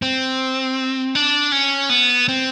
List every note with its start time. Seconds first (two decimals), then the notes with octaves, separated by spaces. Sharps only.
0.02 C4
1.15 D4
1.52 C#4
1.90 B3
2.28 C4